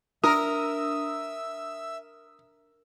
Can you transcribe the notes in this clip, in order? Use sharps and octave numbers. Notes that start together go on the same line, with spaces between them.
D4 A#4 E5 D#6 E6